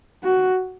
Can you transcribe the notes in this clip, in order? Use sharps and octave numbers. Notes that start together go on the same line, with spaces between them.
F#4